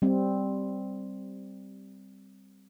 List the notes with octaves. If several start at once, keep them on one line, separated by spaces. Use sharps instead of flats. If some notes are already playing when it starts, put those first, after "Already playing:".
G3 C4